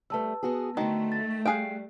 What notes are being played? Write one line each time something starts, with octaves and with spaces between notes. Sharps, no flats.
G3 A3 B4 A5 E6
B3 F#4 G#4
D3 D#3 A3 F#4
A6
G3 G#4 F5 G5 F#6 C7 D7